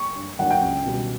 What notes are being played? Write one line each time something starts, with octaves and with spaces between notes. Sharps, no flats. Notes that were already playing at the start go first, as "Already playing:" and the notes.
Already playing: C#6
G2
D3 F#3 A#3 D4 F#5
G5
C#2
B2 G3